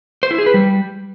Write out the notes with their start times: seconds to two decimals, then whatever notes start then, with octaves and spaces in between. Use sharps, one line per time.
0.23 C5
0.31 E4
0.38 G#4
0.46 B4
0.54 G3